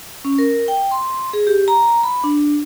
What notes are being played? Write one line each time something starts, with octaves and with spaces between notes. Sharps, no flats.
C#4
A#4
G5
C6
G#4
G4
A#5
B5
D4